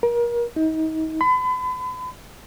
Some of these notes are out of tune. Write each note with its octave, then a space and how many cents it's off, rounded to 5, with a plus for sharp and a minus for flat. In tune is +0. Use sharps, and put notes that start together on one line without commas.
A#4 +30
D#4 +35
B5 +40